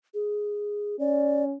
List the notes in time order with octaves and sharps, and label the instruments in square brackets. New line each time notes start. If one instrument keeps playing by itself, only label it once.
[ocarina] G#4
[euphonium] C#4 [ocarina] D5